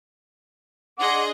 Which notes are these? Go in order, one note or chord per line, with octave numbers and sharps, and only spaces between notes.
D4 G#4 D#5 F#5 C6 D6